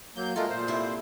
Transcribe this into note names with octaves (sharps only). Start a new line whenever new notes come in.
F#3 A#3 G6
G#3 A3 F4 A4 A#4
A#2 C5
C3 E4